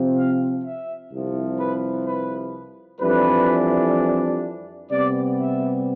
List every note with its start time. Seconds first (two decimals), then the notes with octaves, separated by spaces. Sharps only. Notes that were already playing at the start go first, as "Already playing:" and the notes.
Already playing: C3 F3 C4
0.17 F5
0.64 E5
1.12 C2 C3 F3
1.59 B4
2.06 B4
3.01 F2 E3 G3 D4 B4
4.91 C3 G3 B3 D5
5.39 E5